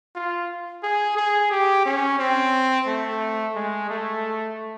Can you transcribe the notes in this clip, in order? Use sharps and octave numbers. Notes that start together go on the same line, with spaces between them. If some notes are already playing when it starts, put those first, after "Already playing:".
F4
G#4
G#4
G4
C#4
C4
A3
G#3
A3